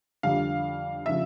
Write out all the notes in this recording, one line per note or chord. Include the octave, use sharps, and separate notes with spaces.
F2 D3 G3 F5
C#3 F3 E5